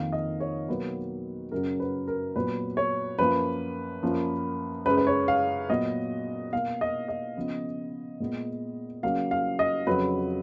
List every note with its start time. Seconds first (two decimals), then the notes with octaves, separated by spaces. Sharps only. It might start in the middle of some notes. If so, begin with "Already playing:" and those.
Already playing: F2 D#3 A#3 F5
0.13 D#5
0.40 C#5
0.68 B2 F#3 A#3 B4
1.52 F#2 C#3 F#3 A#4
1.80 B4
2.08 A#4
2.36 A#2 F#3 B3 B4
2.77 C#5
3.19 F#2 F3 A#3 B4
4.03 F#2 F3 A#3
4.86 F#2 C#3 G#3 B4
4.97 B4
5.07 C#5
5.28 F5
5.69 A#2 F#3 B3 D#5
6.53 B2 A#3 F5
6.81 D#5
7.08 D#5
7.36 C#3 F3 B3
8.20 A#2 G#3 B3
9.03 C#3 F#3 A#3 F5
9.31 F5
9.59 D#5
9.87 F2 C#3 F#3 B4